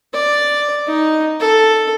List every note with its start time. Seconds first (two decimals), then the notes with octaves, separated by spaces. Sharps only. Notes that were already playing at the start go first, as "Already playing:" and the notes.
0.13 D5
0.87 D#4
1.40 A4